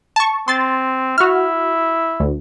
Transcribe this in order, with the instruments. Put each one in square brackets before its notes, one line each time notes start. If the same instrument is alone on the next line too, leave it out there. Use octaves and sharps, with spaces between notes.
[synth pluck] A5 C#6
[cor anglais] C4 [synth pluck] C6 A6
[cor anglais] E4 [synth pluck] F#4 F6
[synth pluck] D2